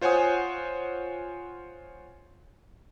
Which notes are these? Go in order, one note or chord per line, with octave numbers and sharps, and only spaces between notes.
F4 C5 C#5 F#5 G#5 D#6